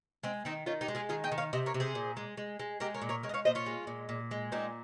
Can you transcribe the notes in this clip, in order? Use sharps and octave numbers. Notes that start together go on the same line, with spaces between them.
G#3 C4
D#3 C4 D#4
D#3 C#4 F4
D#4 G4
G#3
F4 G#4
D#3 F4 G#4
D#5 G5
D#3
C#5 F5
C3 C5 D#5
A#4 C#5
C3
G#4 C5
A#2
G#3
G#3
G#3
G#3 G4 A#4
A#4 C#5
A#2
A#4 C#5
G#3 A#4 C#5
D#5
C#5 F5
A#2 C5 D#5
C#4 F4
G#3
A#2
A#2
G#3
A#2 C4 D#4